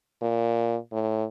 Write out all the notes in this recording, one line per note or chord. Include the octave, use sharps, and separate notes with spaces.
A#2
A2